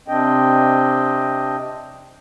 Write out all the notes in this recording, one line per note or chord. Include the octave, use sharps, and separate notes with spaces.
C3 C4 D4 D#5 G5